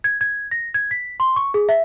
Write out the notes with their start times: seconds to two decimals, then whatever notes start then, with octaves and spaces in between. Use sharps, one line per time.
0.04 G#6
0.21 G#6
0.51 A#6
0.74 G#6
0.91 B6
1.20 C6
1.36 C#6
1.54 G#4
1.69 E5